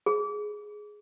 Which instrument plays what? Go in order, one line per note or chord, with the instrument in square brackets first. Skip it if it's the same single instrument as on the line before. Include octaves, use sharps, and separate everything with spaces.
[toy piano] G#4